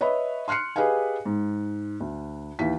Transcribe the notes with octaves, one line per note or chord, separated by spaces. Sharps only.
B4 C#5 D#5 E5 B5
C6 F6 F#6 C7 C#7
G4 G#4 B4 D#5 F5 G#5
G#2
D2
D#2 E3 B6